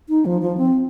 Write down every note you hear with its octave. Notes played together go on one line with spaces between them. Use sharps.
D#4
F3
F3
C4